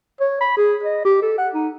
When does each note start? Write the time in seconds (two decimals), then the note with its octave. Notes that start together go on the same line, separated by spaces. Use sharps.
0.20 C#5
0.40 B5
0.57 G#4
0.83 D#5
1.05 G4
1.22 A4
1.38 F#5
1.54 D#4